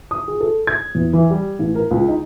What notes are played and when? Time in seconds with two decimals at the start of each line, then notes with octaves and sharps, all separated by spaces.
0.11 D#6
0.28 G#4
0.41 A4
0.67 G#6
0.95 E2
1.13 E3
1.30 G3
1.59 A1
1.75 A#4
1.91 C#2
2.09 D#4